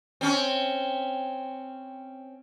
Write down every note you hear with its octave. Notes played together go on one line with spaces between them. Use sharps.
C4 C#4